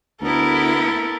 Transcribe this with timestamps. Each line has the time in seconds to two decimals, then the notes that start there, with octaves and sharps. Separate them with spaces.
0.22 D2 B3 E4 A4 A#4